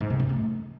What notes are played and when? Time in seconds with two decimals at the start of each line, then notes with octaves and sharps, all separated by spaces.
0.01 G#2
0.10 C3
0.20 F#2
0.29 A3